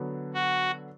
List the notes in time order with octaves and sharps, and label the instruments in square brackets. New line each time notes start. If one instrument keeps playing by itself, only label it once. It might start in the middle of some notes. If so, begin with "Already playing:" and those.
Already playing: [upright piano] D3 F#3 B3
[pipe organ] F#4